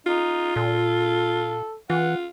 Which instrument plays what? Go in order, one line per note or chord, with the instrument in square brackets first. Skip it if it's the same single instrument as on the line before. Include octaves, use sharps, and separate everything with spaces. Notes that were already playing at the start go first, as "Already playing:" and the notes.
[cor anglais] D#4 [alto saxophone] F4
[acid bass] A#2 [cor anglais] A4
[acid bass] E3 [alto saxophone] F4 [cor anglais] F#5